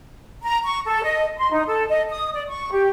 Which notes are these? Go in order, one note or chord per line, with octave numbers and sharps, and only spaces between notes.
A#5
C#6
A4
D#5
C6
D#4
A4
D#5
D#6
D5
C#6
G4